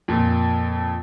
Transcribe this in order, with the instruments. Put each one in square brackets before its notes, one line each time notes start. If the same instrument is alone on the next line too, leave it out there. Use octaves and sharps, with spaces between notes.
[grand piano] F2 A#2